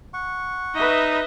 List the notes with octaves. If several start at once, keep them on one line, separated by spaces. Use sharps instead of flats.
F#5 C#6
D#4 B4 D#5 E5